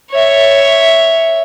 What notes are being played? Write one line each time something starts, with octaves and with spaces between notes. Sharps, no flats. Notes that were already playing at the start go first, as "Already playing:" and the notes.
C#5 E5